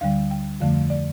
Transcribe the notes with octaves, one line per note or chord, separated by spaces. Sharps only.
D2 D3 G3 F5
G5
F2 D3 F3 A3 F5
D5